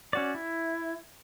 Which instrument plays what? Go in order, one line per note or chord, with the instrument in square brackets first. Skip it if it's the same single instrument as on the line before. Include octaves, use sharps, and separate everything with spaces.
[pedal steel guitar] C#4 F#4 D5
E4